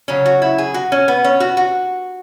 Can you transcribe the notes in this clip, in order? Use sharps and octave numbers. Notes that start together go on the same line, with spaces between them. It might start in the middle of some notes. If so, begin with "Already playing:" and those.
C#3 F#3 C#4
F#4
E4
G#4
F#4
C#4
B3
C#4
F#4
F#4